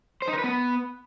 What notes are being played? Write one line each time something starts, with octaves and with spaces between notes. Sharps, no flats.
C5
D#4
A#4
B4
B3